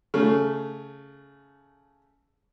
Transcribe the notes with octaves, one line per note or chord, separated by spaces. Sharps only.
C#3 A3